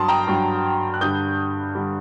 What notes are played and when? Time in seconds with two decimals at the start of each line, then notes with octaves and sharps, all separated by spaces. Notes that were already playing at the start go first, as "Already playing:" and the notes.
Already playing: G2 F#3 A5 C6 D#6
0.08 G5 A#5
0.27 G2 F#3
0.94 F#6
1.01 G2 D3 G3 D#6 G6
1.75 D3 G3